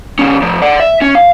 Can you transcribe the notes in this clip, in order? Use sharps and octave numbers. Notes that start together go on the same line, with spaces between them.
D#3 C#4
F3 A3
D5 F#5
E5
C#4
F5